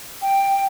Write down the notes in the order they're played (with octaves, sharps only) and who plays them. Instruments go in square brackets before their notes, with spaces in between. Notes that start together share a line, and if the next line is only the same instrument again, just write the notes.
[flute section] G5